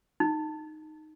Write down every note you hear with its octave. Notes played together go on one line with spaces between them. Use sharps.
D#4